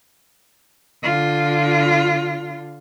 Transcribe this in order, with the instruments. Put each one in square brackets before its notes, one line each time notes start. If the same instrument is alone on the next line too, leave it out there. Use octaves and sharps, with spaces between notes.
[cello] D3 F4